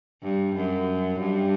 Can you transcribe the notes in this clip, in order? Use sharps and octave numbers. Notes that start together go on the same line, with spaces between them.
G2
F#2
G2